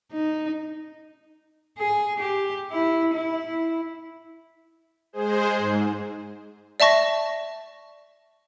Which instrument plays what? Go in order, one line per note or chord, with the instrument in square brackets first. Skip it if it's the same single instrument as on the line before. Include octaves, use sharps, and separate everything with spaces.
[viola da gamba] D#4
[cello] G#4
G4
E4
E4
[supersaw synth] G#3 G#4 C5
G#2
[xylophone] D5 E5 A5 C#6 A#6